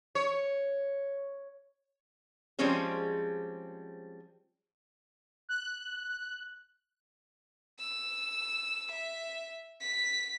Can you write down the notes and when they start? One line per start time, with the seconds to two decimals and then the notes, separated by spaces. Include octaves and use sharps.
0.15 C#5
2.59 F3 G3 G#3 C4 C#4 G#4
5.49 F#6
7.79 E6
8.92 E5
9.81 B6